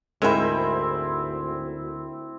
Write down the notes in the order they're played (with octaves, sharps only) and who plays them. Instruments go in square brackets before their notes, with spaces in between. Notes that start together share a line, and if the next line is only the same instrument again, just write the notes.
[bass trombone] D2 [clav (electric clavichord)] G#2 G#3 [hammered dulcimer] C4 E4 [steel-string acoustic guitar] A#4 E5